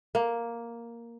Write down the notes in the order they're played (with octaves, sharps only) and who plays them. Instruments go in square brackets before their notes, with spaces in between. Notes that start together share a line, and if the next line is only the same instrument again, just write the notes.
[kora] A#3